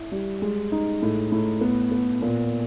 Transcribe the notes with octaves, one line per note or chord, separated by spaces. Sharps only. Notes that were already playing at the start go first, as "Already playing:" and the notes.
Already playing: E4
G3
G#3
D#4
A2
A2
B3
B3
A#2